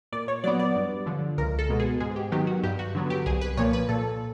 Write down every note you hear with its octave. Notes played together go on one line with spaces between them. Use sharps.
A#2 D5
C#5
F#3 B3 D5
D5
G2
D3 F3
C#2 A#4
A4
B2 G#3 B3
G#4
G#2 G#4
G4
D#3 F#3 B3 G4
F#4
G2 G4
F#4
D3 F#3 B3
G4
C2 G#4
B4
A#2 F3 A#3 C#5
B4
A#2 A4